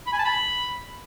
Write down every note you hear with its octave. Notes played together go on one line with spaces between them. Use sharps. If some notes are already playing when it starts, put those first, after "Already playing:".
B5
G#5
A5
B5